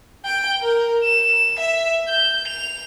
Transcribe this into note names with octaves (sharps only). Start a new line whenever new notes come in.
G5
A#4
E7
E5
G6
F7